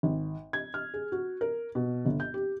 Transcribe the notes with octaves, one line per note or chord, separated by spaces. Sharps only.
G#1
G#6
F6
G#4
F#4
A#4
B2
G1
G6
G4